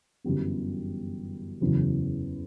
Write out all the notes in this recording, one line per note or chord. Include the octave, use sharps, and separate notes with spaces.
G1 F#2 E3 G3 B3
F#1 E2 C#3 F#3